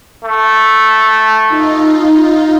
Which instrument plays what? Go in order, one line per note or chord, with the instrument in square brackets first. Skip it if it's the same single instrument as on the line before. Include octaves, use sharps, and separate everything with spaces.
[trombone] A3
[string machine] D#4 F4